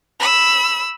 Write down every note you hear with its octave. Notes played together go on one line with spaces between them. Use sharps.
B5 E6